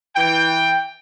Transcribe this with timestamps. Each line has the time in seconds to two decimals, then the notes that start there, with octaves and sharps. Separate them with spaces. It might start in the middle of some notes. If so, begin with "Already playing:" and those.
0.16 E3 G5